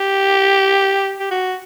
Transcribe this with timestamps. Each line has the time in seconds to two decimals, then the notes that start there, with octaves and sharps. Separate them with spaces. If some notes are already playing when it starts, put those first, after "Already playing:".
Already playing: G4
1.20 G4
1.31 F#4